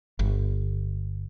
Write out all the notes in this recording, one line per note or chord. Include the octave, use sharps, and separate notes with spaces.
G1